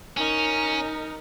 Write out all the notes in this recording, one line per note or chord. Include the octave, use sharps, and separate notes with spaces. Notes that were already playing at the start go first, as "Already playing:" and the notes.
C#4 D#4 A#4